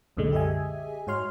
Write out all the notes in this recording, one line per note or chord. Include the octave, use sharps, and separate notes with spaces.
C2 F#2 A#2 D3 G#3
G4 G#4 D#5 E5 G#5
G#2 F#4 C#5 C6 F6